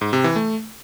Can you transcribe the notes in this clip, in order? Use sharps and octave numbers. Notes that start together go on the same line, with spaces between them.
G#2
C3
E3
A3